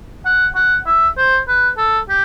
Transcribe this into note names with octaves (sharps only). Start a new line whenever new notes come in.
F#5
F#5
E5
C5
B4
A4
G4